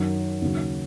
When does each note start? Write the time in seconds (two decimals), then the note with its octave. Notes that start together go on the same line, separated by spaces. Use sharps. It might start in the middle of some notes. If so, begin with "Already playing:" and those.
Already playing: F#2 D#3 F#3
0.42 D#2 C#3 F#3